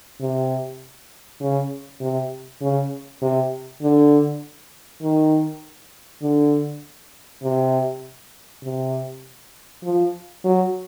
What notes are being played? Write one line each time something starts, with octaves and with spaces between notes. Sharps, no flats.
C3
C#3
C3
C#3
C3
D3
D#3
D3
C3
C3
F3
F#3